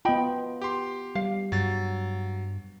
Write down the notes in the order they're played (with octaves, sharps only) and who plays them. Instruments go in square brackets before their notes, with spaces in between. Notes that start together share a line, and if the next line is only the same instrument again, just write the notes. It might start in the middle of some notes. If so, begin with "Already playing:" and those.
[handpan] B3 F4 [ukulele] D#5 G5 B5
[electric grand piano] G4 C6
[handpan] G3 [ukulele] F5
[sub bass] G2 [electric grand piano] F#3 A6